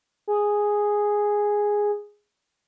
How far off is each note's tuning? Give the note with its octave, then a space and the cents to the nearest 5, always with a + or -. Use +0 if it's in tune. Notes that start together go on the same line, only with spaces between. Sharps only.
G#4 -5